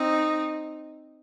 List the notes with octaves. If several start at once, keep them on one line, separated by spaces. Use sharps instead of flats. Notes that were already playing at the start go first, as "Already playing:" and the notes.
Already playing: C4 D#4